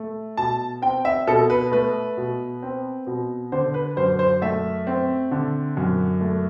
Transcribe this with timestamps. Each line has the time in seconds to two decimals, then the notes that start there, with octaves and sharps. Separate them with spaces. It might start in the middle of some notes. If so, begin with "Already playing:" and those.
Already playing: A3
0.37 B2 A5
0.82 C4 G5
1.05 E5
1.27 B2 A4
1.50 B4
1.72 A3 B4
2.17 B2
2.63 C4
3.07 B2
3.52 D3 C5
3.74 B4
3.97 F#2 C5
4.19 C5
4.42 A3 E5
4.87 C4
5.31 D3
5.77 F#2
6.21 A3